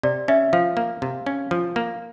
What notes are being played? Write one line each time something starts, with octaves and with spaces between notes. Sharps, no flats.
C3 D5
C#4 E5
F3 F5
A#3
C3
C#4
F3
A#3